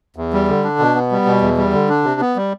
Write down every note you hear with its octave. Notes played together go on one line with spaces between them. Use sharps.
E2
G3
D3
D4
B2
B3
G3
B2
E2
G3
D3
D4
C3
B3
G3